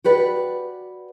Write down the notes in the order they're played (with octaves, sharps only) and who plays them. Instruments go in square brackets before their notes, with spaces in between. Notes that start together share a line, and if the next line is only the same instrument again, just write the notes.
[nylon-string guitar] F#4 G4 B4 D5